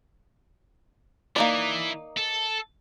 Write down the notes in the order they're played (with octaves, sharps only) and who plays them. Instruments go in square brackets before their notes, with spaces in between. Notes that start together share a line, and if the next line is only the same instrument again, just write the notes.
[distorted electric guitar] E3 [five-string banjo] A#3 D#4 D5
[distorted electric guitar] A4